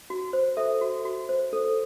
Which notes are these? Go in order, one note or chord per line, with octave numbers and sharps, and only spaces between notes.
F#4
C5
A4 E5
F#4
F#4
C5
A4